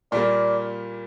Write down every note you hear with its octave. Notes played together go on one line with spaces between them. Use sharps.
A#2 G3 A#3 D5